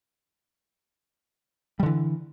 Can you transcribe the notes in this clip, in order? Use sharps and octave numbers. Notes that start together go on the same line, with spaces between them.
D3 E3 G3